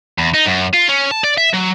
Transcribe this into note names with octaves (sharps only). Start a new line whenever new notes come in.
E2
D#4
F#2
F4
C#4
A5
D5
E5
F#3